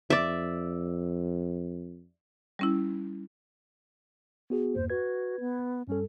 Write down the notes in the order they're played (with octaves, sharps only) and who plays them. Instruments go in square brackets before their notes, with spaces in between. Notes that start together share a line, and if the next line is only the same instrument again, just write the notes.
[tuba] F2 [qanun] D5 E5
[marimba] G3 C#4 E4
[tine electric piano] B3 F#4 G#4
[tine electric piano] E2 G2 A#3 [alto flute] C5
[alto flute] F#4 [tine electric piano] B4 G#6
[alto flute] B3
[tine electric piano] G2 G3 A4 [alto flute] C#4